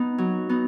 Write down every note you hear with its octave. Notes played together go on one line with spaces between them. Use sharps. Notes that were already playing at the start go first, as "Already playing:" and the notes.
Already playing: B3 D#4
F#3
B3 D#4